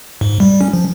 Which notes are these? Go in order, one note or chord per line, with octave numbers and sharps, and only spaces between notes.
G#2
G3
C#4
F3